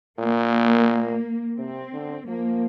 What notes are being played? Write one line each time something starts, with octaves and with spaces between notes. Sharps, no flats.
A#2 A#3
C3 C4
D3
F3 A#3